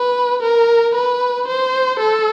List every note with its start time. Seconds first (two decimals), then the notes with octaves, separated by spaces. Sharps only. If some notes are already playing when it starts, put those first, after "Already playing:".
Already playing: B4
0.43 A#4
0.95 B4
1.48 C5
2.00 A4